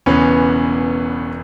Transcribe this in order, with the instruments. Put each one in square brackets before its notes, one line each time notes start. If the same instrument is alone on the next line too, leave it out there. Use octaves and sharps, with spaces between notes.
[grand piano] E1 E2 C#3 E3 [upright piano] B3 C#4